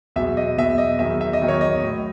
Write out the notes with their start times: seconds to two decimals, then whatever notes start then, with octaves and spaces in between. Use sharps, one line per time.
0.16 E2 B2 F#3 E5
0.37 D#5
0.57 E2 B2 F#3 E5
0.78 D#5
0.99 E2 D#3 F#3 E5
1.21 E5
1.33 D#5
1.41 E2 D#3 F#3
1.48 C#5
1.61 D#5
1.82 A2 F#3